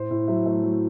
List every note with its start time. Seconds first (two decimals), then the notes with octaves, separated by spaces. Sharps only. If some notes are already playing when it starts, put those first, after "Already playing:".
Already playing: A2 C5
0.11 A2
0.28 F#3 E5
0.46 A3
0.63 F#3